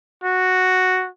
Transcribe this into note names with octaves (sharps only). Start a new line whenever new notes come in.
F#4